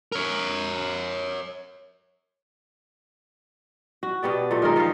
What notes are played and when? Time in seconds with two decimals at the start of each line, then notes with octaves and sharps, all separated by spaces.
0.12 A#4 C#5
4.03 F#4
4.23 B2 B3 G4 D5
4.51 A#2 A3
4.62 D#3 G#3 F4 A#4
4.76 D#3 F3 D#4 F5